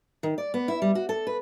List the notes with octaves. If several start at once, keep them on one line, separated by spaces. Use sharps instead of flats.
D#3
D5
B3
E4
G3
F#4
A4
B4